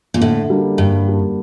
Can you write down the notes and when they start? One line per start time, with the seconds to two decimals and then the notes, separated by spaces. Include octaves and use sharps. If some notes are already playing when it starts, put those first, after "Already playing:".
0.14 A#2
0.20 A2 D3
0.50 G3 A#3 D4
0.78 G2 D3
1.08 G3 A#3 D4